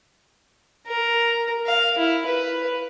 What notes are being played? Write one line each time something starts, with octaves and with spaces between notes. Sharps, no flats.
A#4
F5
E4
B4